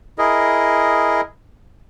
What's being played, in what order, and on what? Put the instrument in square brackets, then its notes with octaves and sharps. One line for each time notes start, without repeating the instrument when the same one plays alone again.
[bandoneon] E4 G#4 A#4 D#5